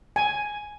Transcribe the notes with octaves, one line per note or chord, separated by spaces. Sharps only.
G#5